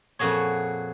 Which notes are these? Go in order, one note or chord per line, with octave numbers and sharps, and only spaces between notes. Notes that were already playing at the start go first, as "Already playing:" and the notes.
F2 A#2 F#4 G#4 C#5